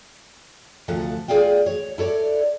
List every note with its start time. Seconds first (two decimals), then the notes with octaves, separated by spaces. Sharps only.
0.88 D2 C3 F3 A4 F5 F#5
1.28 F4 G#4 D5 F5 G5
1.66 C#5
1.98 E4 A4 C#5 D5